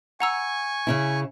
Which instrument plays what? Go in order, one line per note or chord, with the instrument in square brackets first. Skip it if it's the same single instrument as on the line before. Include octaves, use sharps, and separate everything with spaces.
[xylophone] F#5 A#5 E6 [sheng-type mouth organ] G#5 C#6
[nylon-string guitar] C#3 C#4 E4